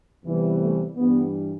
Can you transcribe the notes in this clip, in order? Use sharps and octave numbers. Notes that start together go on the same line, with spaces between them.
E2 C3 E3 G3
A3
G2 E3 G3 B3